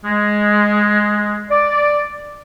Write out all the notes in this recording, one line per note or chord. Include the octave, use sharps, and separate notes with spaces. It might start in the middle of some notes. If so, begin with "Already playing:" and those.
G#3
D5